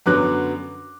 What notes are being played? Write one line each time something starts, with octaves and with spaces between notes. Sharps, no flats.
F#2 D3 F#3 B3 D6 F#6